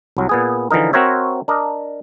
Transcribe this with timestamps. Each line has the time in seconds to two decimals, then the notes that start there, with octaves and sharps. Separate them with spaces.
0.17 C2 F#3
0.29 A#2 B3 G#4
0.71 D3 E3 F3 D#4 A#4
0.93 C4 F#4 A#4 C5 C#5 E5
1.48 D4 A#4 D#5